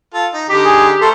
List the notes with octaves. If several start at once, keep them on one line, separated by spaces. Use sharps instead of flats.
F4 A4
D#4
D3 D#4 G4
G#4
A3 A4 A#4 C5 C6